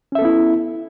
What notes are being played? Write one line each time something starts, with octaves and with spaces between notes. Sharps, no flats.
B3 C#4 E4 A4 E5